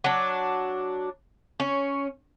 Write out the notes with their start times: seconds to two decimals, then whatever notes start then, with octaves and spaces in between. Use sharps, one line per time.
0.04 F#3 D4
1.60 C#4